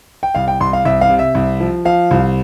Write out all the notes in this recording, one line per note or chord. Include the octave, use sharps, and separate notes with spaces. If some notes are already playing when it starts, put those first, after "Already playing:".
G5
C2 F5
G5
C2 C6
F5
C2 E5
F5
C3
E5
C2
F3
F3 F5
C2